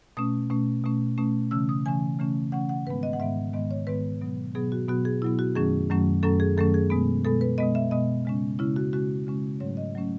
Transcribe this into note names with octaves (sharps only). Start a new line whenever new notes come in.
B2 A3 C#4 D#6
B2 A3 C#4
B2 A3 C#4
B2 A3 C#4
C#3 E3 A3 C#4 E6
D#6
C#3 E3 A3 C#4 G#5
C#3 E3 A3 C#4
C#3 E3 A3 C#4 F#5
F#5
G#2 D#3 G#3 B3 B4
D#5
F#5
G#2 D#3 G#3 B3 E5
G#2 D#3 G#3 B3 D#5
C#5
G#2 D#3 G#3 B3 B4
B2 F#3 B3
B2 F#3 B3 G#4
F#4
B2 F#3 B3 F#4
G#4
B2 F#3 B3 E4
F#4
F#2 D#3 F#3 A3 C#4 G#4
F#2 D#3 F#3 A3 C#4
F#2 D#3 F#3 A3 C#4 A4
G#4
F#2 D#3 F#3 A3 C#4 A4
G#4
B2 G#3 B3
B2 G#3 B3 A4
B4
B2 G#3 B3 D#5
E5
B2 G#3 B3 D#5
C#3 G#3 C#4
C#3 G#3 C#4 E4
F#4
C#3 G#3 C#4 F#4
C#3 G#3 C#4
G#2 F#3 A3 C#4 C#5
D#5
F#3 A3 C#4